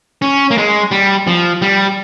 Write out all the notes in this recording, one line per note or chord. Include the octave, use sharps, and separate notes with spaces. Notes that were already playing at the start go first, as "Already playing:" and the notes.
C#4
A#3
G#3
G3
F3
G3